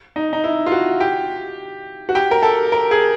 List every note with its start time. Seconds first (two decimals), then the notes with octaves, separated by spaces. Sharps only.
0.16 D#4
0.33 D#4
0.44 E4
0.66 F4
0.72 F#4
1.00 G4
2.09 F#4
2.15 G4
2.31 A#4
2.43 A4
2.72 A#4
2.91 G#4